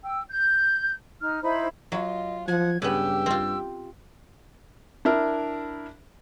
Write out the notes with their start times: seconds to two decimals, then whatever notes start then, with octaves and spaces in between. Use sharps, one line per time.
0.03 G5 E6
0.30 G6
1.21 D#4 F6
1.42 D#4 E4 C5 B5
1.92 F#3 F4 D#5
2.48 F3 F#5 G#6
2.82 G2 C#3 B3 G4 E6
3.26 C4 F4
5.05 D4 E4 A#4